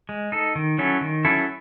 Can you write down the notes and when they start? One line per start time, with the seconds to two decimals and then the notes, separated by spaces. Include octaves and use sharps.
0.09 G#3
0.32 D#4 A4
0.56 D#3
0.78 F#3 C#4 E4 A4
1.01 D#3
1.25 F#3 C#4 E4 A4